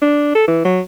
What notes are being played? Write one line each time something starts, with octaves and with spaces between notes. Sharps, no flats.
D4
A4
E3
F#3